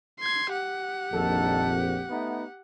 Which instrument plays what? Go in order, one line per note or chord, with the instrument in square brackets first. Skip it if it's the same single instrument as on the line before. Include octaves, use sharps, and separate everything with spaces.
[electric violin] C6 G#6
G4 F#5
[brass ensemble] A#1 F2 [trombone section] D#3 A4
[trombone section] A3 B3 D#4